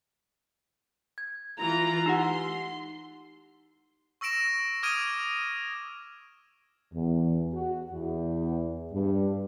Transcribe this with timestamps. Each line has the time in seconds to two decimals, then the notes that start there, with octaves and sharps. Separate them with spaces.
1.18 G#6
1.59 E3 F4 A#5
2.06 D#4 G4 F#5 C6
4.21 C#6 E6 A#6 D7 E7
4.83 D6 D#6 F6 G#6 D7 D#7
6.93 E2
7.53 F#4
7.92 E2
8.92 G2